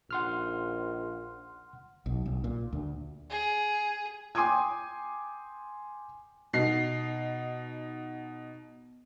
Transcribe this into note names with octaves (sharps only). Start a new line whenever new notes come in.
A#1 F#5 C6 F6
B1
B1
A#2
D2
G#4
G5 G#5 C6 D6 D#6 G#6
B2 D#4 C7